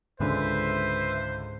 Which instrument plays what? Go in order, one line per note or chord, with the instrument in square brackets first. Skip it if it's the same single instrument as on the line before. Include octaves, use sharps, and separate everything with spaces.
[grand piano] C#2 D3 [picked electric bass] G#2 C#4 [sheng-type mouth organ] B4 E5 [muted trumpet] C5